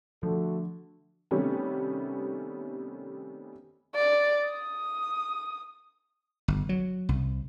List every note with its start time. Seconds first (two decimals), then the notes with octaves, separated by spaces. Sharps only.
0.23 D3 F3 A3 F#4 A4
1.31 C3 D#3 G3 A3 B3 C#4
3.95 D5
4.48 D#6
6.48 G1
6.69 F#3
7.09 C2